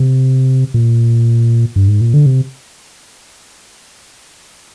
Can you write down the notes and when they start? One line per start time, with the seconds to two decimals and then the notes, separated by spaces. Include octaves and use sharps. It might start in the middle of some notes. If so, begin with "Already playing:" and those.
Already playing: C3
0.74 A#2
1.76 G2
1.88 G#2
2.01 A#2
2.14 D3
2.26 C3